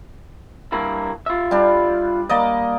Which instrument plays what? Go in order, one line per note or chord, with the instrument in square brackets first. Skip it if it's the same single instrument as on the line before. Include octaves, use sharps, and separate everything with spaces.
[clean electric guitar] G2 A#3 E4
F4 E5
[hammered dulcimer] G3 D4
A#3 D5 D#5